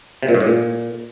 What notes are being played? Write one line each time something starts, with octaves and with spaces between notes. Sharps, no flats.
C3
A#2
G2
A2
A#2